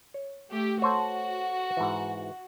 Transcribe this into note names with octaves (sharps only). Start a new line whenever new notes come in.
C#5
A3 G4
F#4 A4 C5 C#5
G#2 E3